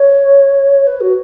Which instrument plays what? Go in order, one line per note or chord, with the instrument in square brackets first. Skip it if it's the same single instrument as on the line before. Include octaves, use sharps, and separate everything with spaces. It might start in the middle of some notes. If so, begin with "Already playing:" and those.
Already playing: [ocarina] C#5
B4
F#4